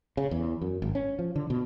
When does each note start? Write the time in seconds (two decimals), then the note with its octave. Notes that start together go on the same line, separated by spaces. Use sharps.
0.17 C#3
0.31 E2
0.61 F#2
0.82 G#1
0.95 C#4
1.19 F3
1.36 D3
1.50 B2